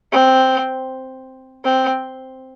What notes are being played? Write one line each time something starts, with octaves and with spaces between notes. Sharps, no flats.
C4
C4